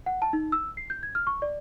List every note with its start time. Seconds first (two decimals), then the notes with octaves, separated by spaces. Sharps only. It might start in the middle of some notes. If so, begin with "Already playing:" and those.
0.06 F#5
0.22 A5
0.33 D#4
0.52 E6
0.77 C7
0.90 G6
1.03 G#6
1.15 F6
1.27 C#6
1.42 D5